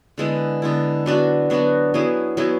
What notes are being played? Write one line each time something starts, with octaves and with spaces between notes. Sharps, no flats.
D3 G#3 B3 E4
D3 G#3 B3 E4
F#3 B3 D4 F#4
F#3 B3 D4 F#4
F#3 B3 E4 G#4
F#3 B3 E4 G#4